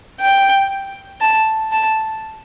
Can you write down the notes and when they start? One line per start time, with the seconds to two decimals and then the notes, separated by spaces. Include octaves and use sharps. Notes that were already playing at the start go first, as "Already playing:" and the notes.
0.21 G5
1.21 A5
1.72 A5